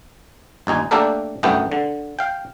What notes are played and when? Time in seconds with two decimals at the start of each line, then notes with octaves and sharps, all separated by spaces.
0.67 G1 D#2 D#4 G#5
0.91 A3 A#3 D4 G4 A4 A#4
1.43 G1 C2 F#2 A3 B3 G5
1.72 D3
2.19 F5 G5